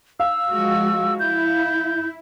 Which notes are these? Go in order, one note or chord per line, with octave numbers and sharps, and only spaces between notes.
F5 E6
F3 G#3 F#4
E4 G6